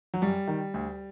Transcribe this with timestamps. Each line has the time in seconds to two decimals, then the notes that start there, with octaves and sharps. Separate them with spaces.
0.14 F#3
0.22 F#2 G3
0.48 D#3
0.74 D2